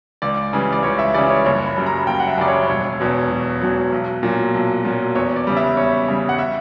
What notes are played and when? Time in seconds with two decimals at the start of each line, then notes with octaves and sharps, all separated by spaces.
0.22 C#2 D5
0.53 C#3 E3 G3
0.72 D5
0.83 C#2 C#5
0.99 E5
1.14 C#3 E3 G3 D5
1.30 C#5
1.45 F#1 C#5
1.66 B5
1.76 F#2 C#3 G3
1.86 A#5
2.07 F#1 G5
2.20 F#5
2.28 E5
2.37 F#2 C#3 G3 D5
2.48 C#5
2.68 E1 C#5
3.00 E2 B2 F#3
3.30 E1
3.62 E2 B2 F#3
3.92 B1
4.23 A#2 F#3
4.54 B1
4.85 A#2 F#3
5.15 E2 C#5
5.36 D5
5.47 C#3 G3
5.57 E5
5.77 E2 C#5
6.08 C#3 G3
6.29 F#5
6.38 E5